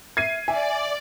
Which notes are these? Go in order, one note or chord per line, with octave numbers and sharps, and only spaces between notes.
E5 G#6 C7 D#7
D5 E5 G#5